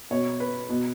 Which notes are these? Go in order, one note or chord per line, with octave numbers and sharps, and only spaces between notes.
B2 C#5
B4
B2